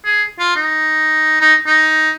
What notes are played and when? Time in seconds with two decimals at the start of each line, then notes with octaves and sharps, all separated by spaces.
0.05 G#4
0.39 F4
0.56 D#4
1.41 D#4
1.67 D#4